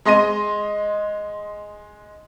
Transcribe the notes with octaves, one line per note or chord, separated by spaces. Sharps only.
G#3 D#5 C6 A#6 D#7